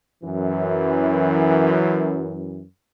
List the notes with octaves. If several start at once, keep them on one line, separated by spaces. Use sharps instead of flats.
F#2 E3